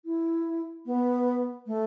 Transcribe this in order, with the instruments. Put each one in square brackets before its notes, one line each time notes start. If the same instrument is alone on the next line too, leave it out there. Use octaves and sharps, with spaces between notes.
[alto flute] E4
B3
A3